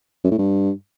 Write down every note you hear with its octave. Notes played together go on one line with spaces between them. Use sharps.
F#2
A2
G2